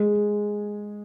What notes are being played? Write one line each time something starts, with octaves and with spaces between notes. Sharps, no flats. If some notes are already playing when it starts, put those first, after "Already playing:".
Already playing: G#3 G#4